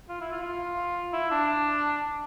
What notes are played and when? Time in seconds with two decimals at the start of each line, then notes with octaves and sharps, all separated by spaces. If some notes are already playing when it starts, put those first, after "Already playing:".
0.09 F4
0.21 E4
0.32 F4
0.43 F4
1.13 E4
1.31 D4